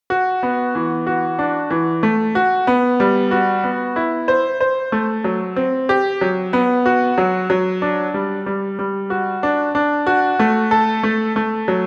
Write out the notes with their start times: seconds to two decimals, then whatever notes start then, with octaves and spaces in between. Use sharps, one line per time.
0.10 F#4
0.43 B3
0.75 E3
1.07 F#4
1.39 D4
1.71 E3
2.03 A3
2.35 F#4
2.67 B3
3.00 G3
3.31 F#4
3.64 B3
3.96 E4
4.28 C5
4.61 C5
4.92 A3
5.24 F#3
5.56 C4
5.89 G4
6.21 F#3
6.53 B3
6.86 F#4
7.18 F#3
7.50 F#3
7.82 D4
8.14 G3
8.46 G3
8.79 G3
9.10 F#4
9.43 D4
9.75 D4
10.07 F#4
10.39 A3
10.71 A4
11.03 A3
11.36 A3
11.68 F#3